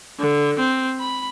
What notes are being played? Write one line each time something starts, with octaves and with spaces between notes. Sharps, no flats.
D3
C4
B5